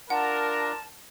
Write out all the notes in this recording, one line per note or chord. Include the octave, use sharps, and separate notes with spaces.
D4 F4 A#4 F#5 A5